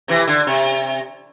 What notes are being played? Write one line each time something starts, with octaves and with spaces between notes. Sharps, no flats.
C3 E3
D3
C3